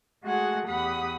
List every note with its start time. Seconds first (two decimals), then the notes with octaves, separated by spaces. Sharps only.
0.23 G#3 A3 F#4 G#4 F#5 G#5
0.67 E2 G4 F#5 B5 D#6